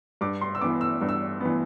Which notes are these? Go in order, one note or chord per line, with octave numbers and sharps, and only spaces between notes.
G2 D6
C6
E6
E3 B3 D6
E6
G2
E6
E3 B3